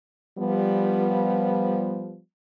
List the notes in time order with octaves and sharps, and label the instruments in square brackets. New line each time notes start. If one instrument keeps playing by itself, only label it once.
[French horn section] F3 G3 B3